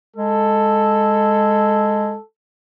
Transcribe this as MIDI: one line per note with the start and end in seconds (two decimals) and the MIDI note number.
0.16 2.16 56
0.16 2.24 69